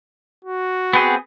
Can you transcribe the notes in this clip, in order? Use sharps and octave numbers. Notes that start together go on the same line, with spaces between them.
F#4
B3 C4 G#4